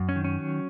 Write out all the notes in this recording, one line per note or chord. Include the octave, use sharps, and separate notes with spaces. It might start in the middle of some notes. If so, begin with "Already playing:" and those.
Already playing: F#2
C#4
D#3
C#4
F#3